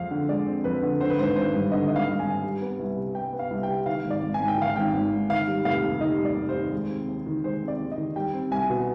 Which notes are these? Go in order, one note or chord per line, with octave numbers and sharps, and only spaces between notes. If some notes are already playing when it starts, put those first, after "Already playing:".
Already playing: F2 G#3 C4 F5
D3
G#3 D5
C4
F2 B4
D3
D3 C5
B4
G#1 C5
G#1 C5
G2
D3 D#5
G#1 D#5
F5
G#1
G#5
G2
G3
B3
C2
C3
G3 G5
B3
F5
C2
G5
C3
D#3 F5
G#1
D5
G#1
G#5
G#2
G5
D#3 F5
G#1 G5
G#1
G#2
D#3 F5
G3
F1 F5
D#2
D#3 D#5
G3
D5
F1
C5
D#2
G#3
C4
D#2
D#3
G#3 C5
C4
D5
D#2
D#5
D#3
G3 G5
C4
C2 G#5
B2